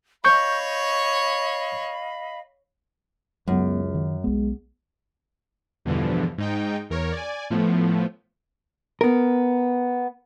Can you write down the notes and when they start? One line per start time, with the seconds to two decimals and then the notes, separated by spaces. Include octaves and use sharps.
0.25 C#5 D#5 F5 B5 C#6 G6
3.48 C#2 F#2 G#3 B3
3.95 D#3
4.24 B1 G#3 B3
5.85 E2 G2 B2 D3 E3 F3
6.38 G#2 D#4 G5
6.90 E2 A#4 C#5
7.12 D5 G#5
7.50 A2 F3 A3 B3
9.01 B3 A#4